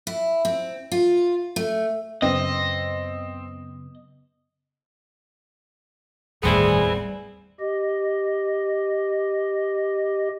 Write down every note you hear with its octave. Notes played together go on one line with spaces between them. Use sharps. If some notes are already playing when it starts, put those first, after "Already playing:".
E4
C4
F4
A3
F#2 C#3 B3 C4 D#5
G1 D#2 A2 G3 B3 C4 E4 G#4
G4 D#5